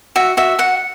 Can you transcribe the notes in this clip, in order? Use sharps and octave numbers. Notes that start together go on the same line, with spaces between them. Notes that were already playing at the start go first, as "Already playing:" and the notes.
F#4 E5
F#4 E5
F#4 F#5